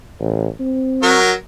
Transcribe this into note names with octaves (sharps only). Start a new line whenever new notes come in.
A1
C4
F#3 F#4 A#4